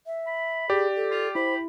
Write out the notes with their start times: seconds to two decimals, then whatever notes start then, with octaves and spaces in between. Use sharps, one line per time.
0.06 E5
0.27 B5
0.70 G4 G#4 D5
0.96 A4
1.11 F4
1.35 E4 C5 B5